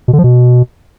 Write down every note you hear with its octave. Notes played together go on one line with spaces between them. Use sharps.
B2
D3
F3
B2